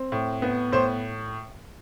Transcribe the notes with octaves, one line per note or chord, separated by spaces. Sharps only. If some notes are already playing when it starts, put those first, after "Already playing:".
Already playing: C4
A2
B3
A2 C5